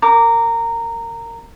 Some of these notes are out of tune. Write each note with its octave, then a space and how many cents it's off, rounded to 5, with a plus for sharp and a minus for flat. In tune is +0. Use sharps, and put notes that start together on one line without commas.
A#4 -15 D6 -5